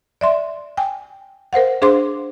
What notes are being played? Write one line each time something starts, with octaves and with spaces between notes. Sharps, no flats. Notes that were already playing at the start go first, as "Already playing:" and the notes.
D5 E5 C6
G5 G#5
A#4 C5 F5 F#5
D4 G#4 C5 F5 C6 D6